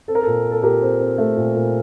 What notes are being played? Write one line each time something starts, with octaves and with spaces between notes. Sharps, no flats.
C4 A4
A#4
A#2 A4
C4
A4
A#2 G4 A#4
C4
C4
A3
A#2
A#2